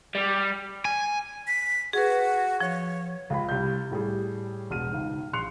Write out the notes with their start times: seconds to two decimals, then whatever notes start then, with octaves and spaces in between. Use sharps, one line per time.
0.15 G3
0.85 G#5
1.48 B6
1.93 F#4 G#4 B4
2.60 F3 C#5
3.30 C#2 F4 B5
3.49 C2 G6
3.91 A2 G3 G#4
4.70 E1 B2 F6 D#7
4.91 C#2 G#2
5.33 A#1 C6 F#6 C#7 F7